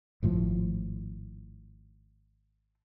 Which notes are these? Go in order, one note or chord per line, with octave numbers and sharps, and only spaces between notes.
G#1 A2 F3